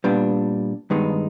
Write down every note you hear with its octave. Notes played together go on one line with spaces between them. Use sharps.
A#2 G3 B3 D4
G2 D#3 G#3 B3 D#4